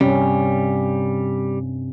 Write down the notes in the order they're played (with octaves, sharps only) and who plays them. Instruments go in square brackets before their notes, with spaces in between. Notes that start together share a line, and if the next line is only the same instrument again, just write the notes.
[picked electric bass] G2 C3 [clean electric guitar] G3 [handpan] C#4